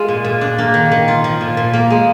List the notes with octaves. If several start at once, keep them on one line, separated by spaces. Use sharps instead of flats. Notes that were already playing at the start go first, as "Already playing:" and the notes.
Already playing: G#3 F4 G#4
A#2
A#2
D4
A#3
D#3
D#3
F4
F3
A#2
A#2
A#3
G#3